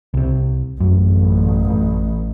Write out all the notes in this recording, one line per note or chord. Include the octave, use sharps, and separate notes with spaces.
C2 C3
A1 F#2